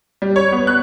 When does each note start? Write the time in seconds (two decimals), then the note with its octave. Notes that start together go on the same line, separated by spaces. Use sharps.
0.22 G3
0.36 C#5
0.52 B3
0.67 F#6